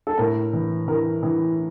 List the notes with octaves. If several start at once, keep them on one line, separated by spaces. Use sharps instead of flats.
A4
A2 A#4
E3
E3 A#4
E3